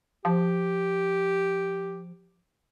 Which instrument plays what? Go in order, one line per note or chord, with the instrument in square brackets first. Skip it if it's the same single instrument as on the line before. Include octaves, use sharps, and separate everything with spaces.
[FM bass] F3 [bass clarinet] G4